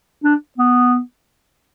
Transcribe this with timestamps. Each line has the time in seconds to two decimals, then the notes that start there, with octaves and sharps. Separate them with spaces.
0.24 D4
0.58 B3